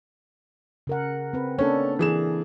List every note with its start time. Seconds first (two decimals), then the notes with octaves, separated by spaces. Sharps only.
0.87 C#3 A#4 F#5
1.33 C4 B4
1.59 A#3 C#4 D4 A4
1.99 E3 G#4 E7